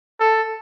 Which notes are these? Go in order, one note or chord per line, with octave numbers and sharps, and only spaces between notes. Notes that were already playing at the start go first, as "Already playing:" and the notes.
A4